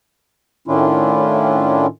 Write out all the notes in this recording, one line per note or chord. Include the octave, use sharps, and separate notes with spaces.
A2 D#3 C#4 D4 E4 F4